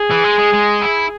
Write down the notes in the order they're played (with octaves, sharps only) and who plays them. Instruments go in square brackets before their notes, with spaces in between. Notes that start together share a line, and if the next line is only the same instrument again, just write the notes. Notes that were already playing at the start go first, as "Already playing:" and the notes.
Already playing: [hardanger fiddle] G#4
[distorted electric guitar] E3
G#3
G#3
G#3
E4